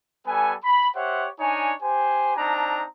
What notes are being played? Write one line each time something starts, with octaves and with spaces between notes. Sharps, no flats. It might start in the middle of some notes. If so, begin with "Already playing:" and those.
G3 B3 A4 G#5
B5
G4 C5 C#5 E5 F#5
D4 D#4 C#5 G#5
G4 C5 G#5
C4 D4 D#4 A5 A#5